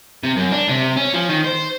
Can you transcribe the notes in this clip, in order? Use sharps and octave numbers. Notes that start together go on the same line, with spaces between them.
C3
F#2
D4
C3
C#4
F3
D#3
C5